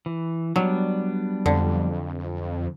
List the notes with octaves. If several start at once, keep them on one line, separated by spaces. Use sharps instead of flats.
E3
F#3 G3 B3 D4
F2 D3